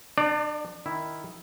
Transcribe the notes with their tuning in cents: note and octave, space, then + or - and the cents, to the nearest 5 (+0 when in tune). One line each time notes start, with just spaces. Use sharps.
D4 +40 D5 +0
D#3 +0 E4 +0